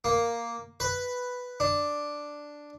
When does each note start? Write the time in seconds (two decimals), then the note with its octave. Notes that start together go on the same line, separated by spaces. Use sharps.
0.04 A#3
0.80 B4
1.60 D4